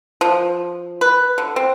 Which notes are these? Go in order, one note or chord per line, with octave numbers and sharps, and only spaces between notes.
F3
B4
D3
C4